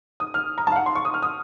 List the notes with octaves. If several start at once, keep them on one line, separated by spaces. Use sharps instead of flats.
D#6
F6
A#5
A5
F5
F#5
C6
C#6
D#6
F6
D#6